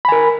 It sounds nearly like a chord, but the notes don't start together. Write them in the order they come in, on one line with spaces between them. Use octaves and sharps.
B5 G#5 A#4